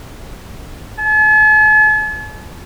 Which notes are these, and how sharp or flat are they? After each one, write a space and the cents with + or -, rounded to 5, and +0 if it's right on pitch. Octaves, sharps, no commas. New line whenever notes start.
A5 -45